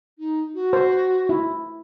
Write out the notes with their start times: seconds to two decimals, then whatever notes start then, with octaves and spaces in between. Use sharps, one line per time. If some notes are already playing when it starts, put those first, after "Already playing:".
0.19 D#4
0.55 F#4
0.73 C5
1.29 E4